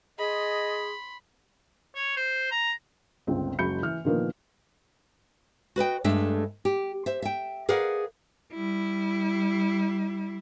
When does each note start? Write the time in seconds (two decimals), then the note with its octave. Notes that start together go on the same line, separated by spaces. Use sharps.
0.18 G#4 D#5 B5 C6
1.95 C#5
2.17 C5
2.51 A#5
3.27 G1 C#2 C4
3.59 F#1 G#3 F#4 B5 G6 C#7
3.83 E3 F6
4.05 A#2 D3 D#3 F3 A#3 B3
5.76 F#4 B4 D#5 G5
6.04 G2 G#3 A3 D4 E5
6.65 G4
7.06 C5 E5
7.22 E5 G5
7.69 G#4 A#4 B4 D5 F5 F#5
8.54 G3 E4